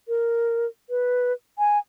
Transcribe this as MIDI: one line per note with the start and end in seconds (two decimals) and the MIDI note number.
0.08 0.66 70
0.90 1.33 71
1.59 1.79 80